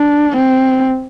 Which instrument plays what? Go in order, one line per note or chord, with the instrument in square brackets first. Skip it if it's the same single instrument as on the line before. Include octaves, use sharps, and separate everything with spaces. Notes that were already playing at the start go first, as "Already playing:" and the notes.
Already playing: [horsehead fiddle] D4
C4